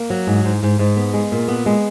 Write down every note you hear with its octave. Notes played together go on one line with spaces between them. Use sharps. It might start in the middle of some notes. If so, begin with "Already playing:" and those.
Already playing: A#3
F#3
G#2
G#2
G#2
G#2
B3
G#3
A#2
B3
G#3